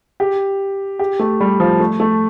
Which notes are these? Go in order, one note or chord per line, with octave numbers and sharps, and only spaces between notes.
G4
G4
A3
G3
F3
A3
A3